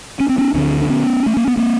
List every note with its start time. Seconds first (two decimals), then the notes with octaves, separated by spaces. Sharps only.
0.20 C#4
0.29 C4
0.38 B3 C#4
0.54 D2 D3 C4 D4
0.81 D4
0.89 B3 C#4
1.26 A3
1.37 A#3
1.48 B3
1.57 A#3 C4